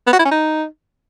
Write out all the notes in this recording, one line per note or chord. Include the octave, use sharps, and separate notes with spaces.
B3
F#4
E4
C#4
D#4